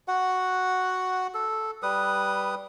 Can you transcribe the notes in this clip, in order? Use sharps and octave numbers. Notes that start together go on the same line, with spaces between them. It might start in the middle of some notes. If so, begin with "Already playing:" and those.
F#4 F#5
A4
G3 B4 D#6